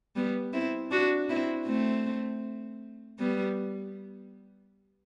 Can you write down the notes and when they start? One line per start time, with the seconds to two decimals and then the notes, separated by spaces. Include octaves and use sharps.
0.16 G3 B3
0.53 C4 E4
0.91 D4 F#4
1.30 C4 E4
1.67 A3 C4
3.19 G3 B3